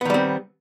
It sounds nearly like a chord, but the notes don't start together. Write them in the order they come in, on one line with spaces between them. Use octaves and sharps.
B3 D#3 G3 C4